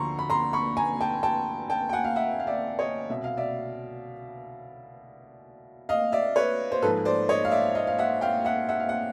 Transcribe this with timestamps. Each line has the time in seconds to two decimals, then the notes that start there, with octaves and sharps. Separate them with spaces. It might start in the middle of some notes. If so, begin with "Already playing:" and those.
Already playing: D2 D3 F3 A#5 C6 C#6
0.19 B5
0.30 A#5 C6
0.53 B5 C#6
0.77 G#5 A#5
1.01 G5 A5
1.23 G5 A5
1.70 G5 A5
1.89 G5
1.93 F#5 G#5
2.05 F5
2.16 E5 F#5
2.40 F5
2.47 D5 E5
2.79 C#5 D#5
3.09 C2 B2 E5
3.24 F5
3.37 D5 E5
5.89 D#5 F5
6.12 D5 E5
6.36 B4 C#5
6.72 C5
6.82 G#2 F3 A4 B4
7.05 C5 D5
7.29 C#5 D#5
7.45 F5
7.52 D5 E5
7.75 D#5 F5
7.87 F5
7.99 E5 F#5
8.21 F5 G5
8.45 E5 F#5
8.69 E5 F#5
8.80 F5
8.89 F#5